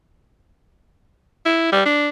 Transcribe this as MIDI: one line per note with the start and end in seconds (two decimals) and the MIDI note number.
1.45 1.68 64
1.72 1.83 55
1.85 2.09 62